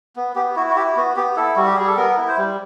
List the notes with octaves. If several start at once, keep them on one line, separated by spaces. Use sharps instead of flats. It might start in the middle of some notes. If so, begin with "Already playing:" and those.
B3
B3 G4
E4 F#4
F#4
E4 G4
B3 F#4
B3 G4
E4 A4
G3 F#4
G4
G3 G#4
A4
B3 A#4
E4
C5
G3